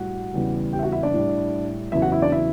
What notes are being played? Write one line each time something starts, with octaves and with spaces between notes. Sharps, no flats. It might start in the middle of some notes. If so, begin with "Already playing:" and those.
Already playing: A2 G3 F#4 F#5
E2 C#3 E3 G3
G4 G5
E5
F#4 F#5
E4 E5
D4 D5
A2 G3
E2 C#3 F#3 E4 E5
F#4 F#5
E4 E5
D4 D5
E4 E5